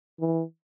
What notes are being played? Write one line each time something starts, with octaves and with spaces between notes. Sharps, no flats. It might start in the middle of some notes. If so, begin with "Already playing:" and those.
E3